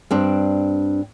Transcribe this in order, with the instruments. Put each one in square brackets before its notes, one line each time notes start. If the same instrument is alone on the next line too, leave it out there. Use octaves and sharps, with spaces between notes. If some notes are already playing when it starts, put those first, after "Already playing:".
[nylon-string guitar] G2 C4 D4